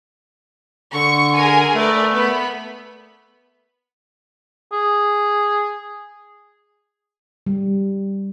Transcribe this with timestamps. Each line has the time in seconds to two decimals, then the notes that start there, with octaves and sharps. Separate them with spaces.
0.94 D3 C#6
1.37 G#4 A#4 G#5
1.74 A3 A#4 B4 D5
2.12 B3 B5
4.73 G#4
7.47 G3